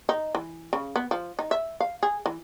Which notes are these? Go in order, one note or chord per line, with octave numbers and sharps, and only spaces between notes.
D#4
E3
C#3
B3
F3
D#4
E5
F5
G#4
E3